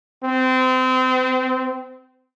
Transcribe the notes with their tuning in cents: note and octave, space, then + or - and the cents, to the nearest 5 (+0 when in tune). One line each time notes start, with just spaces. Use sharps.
C4 -30